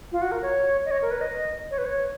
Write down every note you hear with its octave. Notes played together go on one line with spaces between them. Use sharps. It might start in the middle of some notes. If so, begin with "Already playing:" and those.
F4
F#4
A#4
C#5
D#5
C#5
A#4
B4
D#5
C#5
B4
C#5